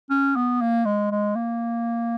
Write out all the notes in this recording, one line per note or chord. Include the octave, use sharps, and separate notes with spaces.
C#4
B3
A#3
G#3
G#3
A#3